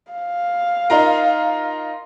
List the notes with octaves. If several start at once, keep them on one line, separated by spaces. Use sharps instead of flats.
F5
D#4 F4 A#4